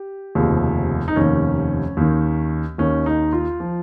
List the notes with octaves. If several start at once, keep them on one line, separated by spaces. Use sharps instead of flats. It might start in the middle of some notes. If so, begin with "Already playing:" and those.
Already playing: G4
F1 D#2 C#3 F3
D#4
F1 D#2 D#3 C#4
D#2 D#3
D#2 D#3 C#4
D#4
F4
F3